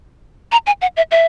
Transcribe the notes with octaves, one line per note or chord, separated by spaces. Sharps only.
A#5
G#5
F#5
E5
E5